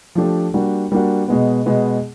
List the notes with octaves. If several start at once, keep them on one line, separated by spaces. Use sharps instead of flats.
F3 A3 D4 G4
G3 A#3 D4 F#4
G3 A#3 D4 F#4
B2 G#3 B3
B2 G#3 B3